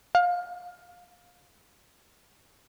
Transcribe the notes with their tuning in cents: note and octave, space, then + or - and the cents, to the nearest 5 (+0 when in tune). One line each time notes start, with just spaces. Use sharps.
F5 +25